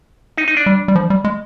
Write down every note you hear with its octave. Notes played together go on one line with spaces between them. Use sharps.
D#4
D#4
D4
G3
G3
F3
G3
G#3